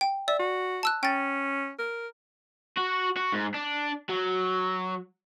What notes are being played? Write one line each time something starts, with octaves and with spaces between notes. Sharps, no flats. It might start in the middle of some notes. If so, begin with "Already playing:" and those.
G5
D5 E5
F#4
A5 E6 F#6
C#4 G5 A6
A#4
F#4
F#4
G#2
D4
F#3